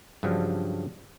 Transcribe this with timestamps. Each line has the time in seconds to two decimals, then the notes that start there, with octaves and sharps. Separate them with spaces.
0.23 G2 C#3 F3 F#3 D4